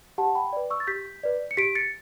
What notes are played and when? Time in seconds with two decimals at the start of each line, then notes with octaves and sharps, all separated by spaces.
0.18 G4 F#5 A5
0.35 G5 B5
0.53 B4 D5
0.70 C#6 E6
0.80 A6
0.87 G4 G6 B6
1.23 B4 D5
1.51 C#7
1.57 G4 B6 D7
1.75 A6 C#7